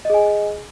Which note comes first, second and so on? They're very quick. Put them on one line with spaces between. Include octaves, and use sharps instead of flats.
D#5 G#4 G#5